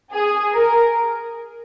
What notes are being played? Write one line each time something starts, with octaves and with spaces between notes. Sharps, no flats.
G#4
A#4